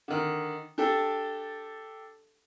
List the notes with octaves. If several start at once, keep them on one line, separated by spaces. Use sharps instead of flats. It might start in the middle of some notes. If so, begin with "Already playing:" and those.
D3 D#3
D4 G4 A4